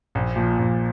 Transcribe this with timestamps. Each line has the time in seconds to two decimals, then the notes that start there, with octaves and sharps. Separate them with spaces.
0.15 A#1
0.36 A#2 F3
0.59 A#1